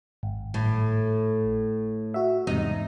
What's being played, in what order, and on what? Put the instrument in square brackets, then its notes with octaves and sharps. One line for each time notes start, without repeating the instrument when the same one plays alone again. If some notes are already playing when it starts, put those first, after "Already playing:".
[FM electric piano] G#1
[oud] A2
[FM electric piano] F#4 E5
[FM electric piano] E2 G#2 C3 [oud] D#4